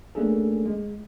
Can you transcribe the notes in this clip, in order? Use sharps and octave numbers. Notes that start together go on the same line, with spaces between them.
A3 A#3 C#4 D4 G#4 A4
G#3